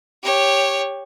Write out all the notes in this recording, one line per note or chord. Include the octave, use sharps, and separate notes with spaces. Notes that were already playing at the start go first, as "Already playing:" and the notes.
G4 C#5